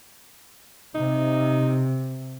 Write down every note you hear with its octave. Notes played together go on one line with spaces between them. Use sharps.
C3 D#4